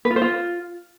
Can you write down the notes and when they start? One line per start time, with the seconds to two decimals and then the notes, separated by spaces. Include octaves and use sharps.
0.05 B4
0.11 F4
0.16 C5
0.22 F4